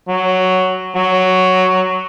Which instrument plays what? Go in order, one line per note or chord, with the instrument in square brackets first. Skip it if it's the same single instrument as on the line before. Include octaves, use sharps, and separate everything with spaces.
[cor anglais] F#3
F#3